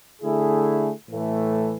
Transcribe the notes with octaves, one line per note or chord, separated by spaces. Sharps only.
D3 A3 E4 G#4
A2 E3 A3